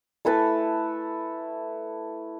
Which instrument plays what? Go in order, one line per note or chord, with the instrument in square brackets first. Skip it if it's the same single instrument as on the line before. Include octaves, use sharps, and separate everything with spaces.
[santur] A3 E4 B4 A5